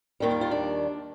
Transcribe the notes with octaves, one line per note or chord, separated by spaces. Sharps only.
D#2 D#3 G3
F4
F4
D4